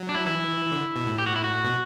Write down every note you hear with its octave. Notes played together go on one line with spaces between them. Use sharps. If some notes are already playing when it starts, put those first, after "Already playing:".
Already playing: F#3
D4
E4
E3 E4
D3
B2
A2
G4
F#4
E4
F#4
B2